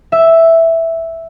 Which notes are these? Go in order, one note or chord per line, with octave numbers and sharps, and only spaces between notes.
E5